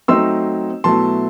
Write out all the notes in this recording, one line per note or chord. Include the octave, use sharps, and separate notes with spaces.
F#3 A3 C4 D#4 C6 E6
B2 F#3 A3 E4 A5 C6